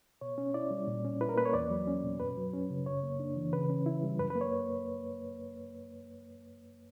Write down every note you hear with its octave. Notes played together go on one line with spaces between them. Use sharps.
B2 C#5
C#4
E4 D5
G3
A#2
C#4
E4 B4
A#4
A#3 B4
C#5
E2 D5
F#3
C#4
B2
F#2 B4
F#3
C#4
C#3
F#2 C#5
A#3
D4
E3
C#3 B4
C#4
E4
G3
F#2 B4
B4
A#3
C#5